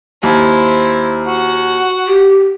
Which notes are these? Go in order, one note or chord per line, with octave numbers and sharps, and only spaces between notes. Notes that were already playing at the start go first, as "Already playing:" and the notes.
D#2 E4 C5
F#4 F#5
G4